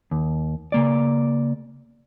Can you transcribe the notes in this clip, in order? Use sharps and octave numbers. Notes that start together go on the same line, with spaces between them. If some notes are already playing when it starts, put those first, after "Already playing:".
D#2
C#3 A#3 D5